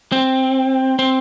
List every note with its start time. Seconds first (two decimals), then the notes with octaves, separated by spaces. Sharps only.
0.12 C4
0.99 C4